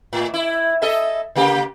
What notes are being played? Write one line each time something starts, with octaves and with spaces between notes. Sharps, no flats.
A2
E4
A4 D#5 E5
C#3 A#3 G4